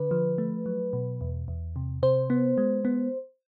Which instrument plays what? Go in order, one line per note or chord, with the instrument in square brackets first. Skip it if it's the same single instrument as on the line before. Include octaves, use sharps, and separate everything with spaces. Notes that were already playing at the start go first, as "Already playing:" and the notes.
Already playing: [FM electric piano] D3 B4
F3
A3
F#3
B2
E2
E2
C3
C3 C5
B3
G#3
B3